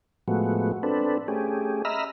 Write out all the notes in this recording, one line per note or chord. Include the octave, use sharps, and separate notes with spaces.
A2 F3 G#3 A3 B3 F#4
C4 D4 A4 B4
A3 C#4 G4 G#4
D#5 E5 A#5 B5 E6 F6